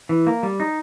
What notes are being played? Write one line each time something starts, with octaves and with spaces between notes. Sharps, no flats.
E3
A#3
G3
D#4